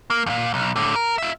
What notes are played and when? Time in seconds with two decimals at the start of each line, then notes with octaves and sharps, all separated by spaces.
0.10 A#3
0.26 F2 A#2
0.54 B1
0.76 A2 D3
0.95 A#4
1.18 F4 E5